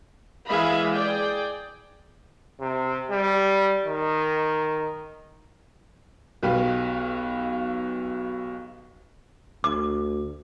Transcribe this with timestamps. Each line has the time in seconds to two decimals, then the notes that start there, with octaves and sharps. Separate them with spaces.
0.47 E3 G#3 E5 F5 B5
0.95 G#4 D5 G5
2.60 C3
3.11 G3
3.86 D#3
6.43 B1 B2 G4 B4 F5
9.64 D2 D6